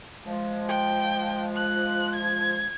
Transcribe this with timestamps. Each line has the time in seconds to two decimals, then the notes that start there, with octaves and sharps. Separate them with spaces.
0.27 F3 G#3
0.69 G5
1.56 F#6
2.15 G#6